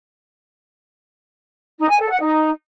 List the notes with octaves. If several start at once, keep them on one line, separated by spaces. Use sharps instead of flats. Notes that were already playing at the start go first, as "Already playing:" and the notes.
D#4
G#5
A4
F#5
D#4